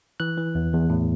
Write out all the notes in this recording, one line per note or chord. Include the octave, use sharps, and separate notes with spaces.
E3 F#6
E3
E2
E2
A2